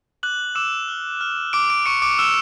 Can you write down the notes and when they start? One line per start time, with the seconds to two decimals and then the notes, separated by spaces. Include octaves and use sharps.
0.23 D6 F#6 F#7
0.55 D6 E6 E7
0.88 F6
1.21 F6
1.53 D6 D7
1.70 D6 D7
1.86 C#6 D6 C#7
2.02 D6 D7
2.19 E6 F6 E7